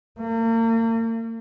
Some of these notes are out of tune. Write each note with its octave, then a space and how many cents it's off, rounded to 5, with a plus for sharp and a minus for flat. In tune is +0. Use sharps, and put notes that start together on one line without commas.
A#3 -40